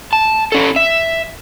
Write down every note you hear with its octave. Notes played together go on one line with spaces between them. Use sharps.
A5
C#4 A4
E5